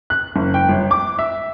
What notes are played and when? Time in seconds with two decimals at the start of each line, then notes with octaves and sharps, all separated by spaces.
0.10 F#6
0.36 F#1
0.54 G5
0.69 G1
0.91 D6
1.19 E5